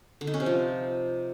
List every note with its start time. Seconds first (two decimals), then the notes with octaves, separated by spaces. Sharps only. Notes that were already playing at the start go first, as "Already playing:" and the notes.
0.21 D3
0.27 D#4
0.34 C#4
0.40 C3
0.46 F3